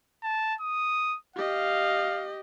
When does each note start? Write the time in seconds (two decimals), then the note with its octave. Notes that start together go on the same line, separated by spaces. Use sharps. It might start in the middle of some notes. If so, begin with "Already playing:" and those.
0.23 A5
0.61 D#6
1.36 G4 D#5 F5